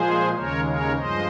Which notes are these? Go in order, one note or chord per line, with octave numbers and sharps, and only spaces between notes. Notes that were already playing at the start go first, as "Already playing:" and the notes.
Already playing: A#2 F3 G#3 G#4 C5
D#2 C#3 G#3 A#4 C#5
A#4 C#5
G2 F3 G#3 C5 D#5